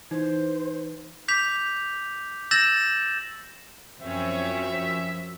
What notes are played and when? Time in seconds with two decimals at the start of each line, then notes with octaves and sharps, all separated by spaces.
0.11 E3 D#4 C5
1.28 D6 G6 B6 F7
2.51 E6 G6 A6 A#6 E7 F#7
4.01 F#2 F3 C4 C#4 C#5 E5